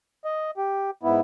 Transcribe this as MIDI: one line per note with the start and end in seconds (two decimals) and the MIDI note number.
0.25 0.51 75
0.57 0.91 67
1.03 1.21 44
1.03 1.21 59
1.03 1.21 64